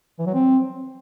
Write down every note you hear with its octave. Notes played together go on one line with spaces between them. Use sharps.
E3
F#3
C4